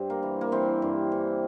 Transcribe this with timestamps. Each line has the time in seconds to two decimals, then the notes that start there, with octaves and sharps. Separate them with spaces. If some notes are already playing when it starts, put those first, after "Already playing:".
Already playing: G2 C4
0.10 A#3
0.23 E3
0.41 A#3
0.52 E3 C4
0.82 G2
1.12 E3